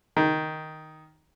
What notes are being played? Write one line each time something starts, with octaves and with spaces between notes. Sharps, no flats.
D#3